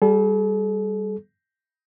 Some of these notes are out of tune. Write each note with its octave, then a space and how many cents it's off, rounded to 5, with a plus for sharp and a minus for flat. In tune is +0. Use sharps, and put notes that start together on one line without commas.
G3 +0 A4 -45